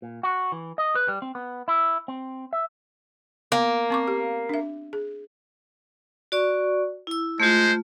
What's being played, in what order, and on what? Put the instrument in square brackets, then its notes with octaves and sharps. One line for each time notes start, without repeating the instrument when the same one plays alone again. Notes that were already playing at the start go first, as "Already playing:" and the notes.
[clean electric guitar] A#2
F#4
E3
D#5
B4
G3
C4
B3
E4
C4
E5
[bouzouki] A#3 [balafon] B3
[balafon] C4 C#6 D6
G4
D4 E5
G#4
[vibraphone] F#4 D5 C#6
E4 E6
[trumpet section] G#3 C5 [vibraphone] A3 F4